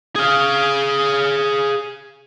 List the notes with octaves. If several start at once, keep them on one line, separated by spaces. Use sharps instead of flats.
G#4 F5